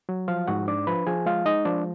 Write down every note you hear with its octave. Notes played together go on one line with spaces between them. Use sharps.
F#3
F3 F4 F5
G#2 F#4 F#5
D4 D5 D6
F3 B4 B5
F3 G#4 G#5
G#3 F4 F5
G#3 D#4 D#5
F3 D4 D5